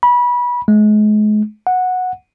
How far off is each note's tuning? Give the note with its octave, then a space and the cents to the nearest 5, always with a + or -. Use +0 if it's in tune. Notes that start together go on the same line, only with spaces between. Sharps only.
B5 -25
G#3 +35
F#5 -10